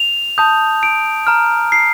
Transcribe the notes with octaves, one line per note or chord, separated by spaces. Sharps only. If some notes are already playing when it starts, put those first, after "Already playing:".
Already playing: F7
A5 D#6 G6
D7
A#5 F6
C7